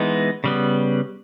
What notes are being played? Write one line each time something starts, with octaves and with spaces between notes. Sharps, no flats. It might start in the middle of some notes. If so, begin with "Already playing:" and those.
Already playing: E3 G#3 B3 D#4
C#3 G3 B3